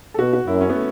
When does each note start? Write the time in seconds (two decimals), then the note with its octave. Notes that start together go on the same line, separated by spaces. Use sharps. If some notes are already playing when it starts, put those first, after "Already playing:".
0.14 A4
0.19 B2 F#4
0.33 F#4
0.47 F#2 E4
0.61 C#4
0.69 B3
0.75 A3